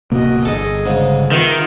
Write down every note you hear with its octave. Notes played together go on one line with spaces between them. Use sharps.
D1 C3 A#3 F#4 D#5
G1 G#4 A4 D#5
G#2 C#3
D#3 F4 B4 E5 F#5